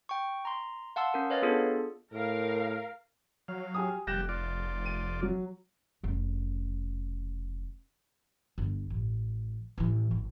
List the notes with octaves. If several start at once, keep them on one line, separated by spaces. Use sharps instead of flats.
G5 C#6
A#5 C6
F5 F#5 A5 C6 E6
C#4 A#4
B4 C#5 D#5 F5 F6 A6
B3 D4 F4 G#4 A4
A2 A#4 F5
F#3 F5
G4 G#5 D#6
F1 G3 G4 F#6 A#6 E7
F4 D5
D#7
F#3
F1 C#3
G1
A1
A1 E3
G#1